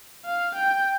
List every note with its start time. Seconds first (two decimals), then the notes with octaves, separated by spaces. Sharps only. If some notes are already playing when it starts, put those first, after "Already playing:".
0.25 F5
0.55 G5